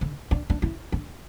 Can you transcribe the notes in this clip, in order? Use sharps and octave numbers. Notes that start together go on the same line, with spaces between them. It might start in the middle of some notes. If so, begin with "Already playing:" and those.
D3
D4
D4
E4
D4